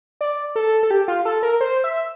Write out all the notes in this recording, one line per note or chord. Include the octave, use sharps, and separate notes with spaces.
D5
A4
A4
G4
F4
A4
A#4
C5
E5